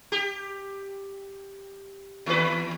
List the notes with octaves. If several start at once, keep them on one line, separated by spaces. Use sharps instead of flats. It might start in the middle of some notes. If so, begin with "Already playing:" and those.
G4
D#2 B4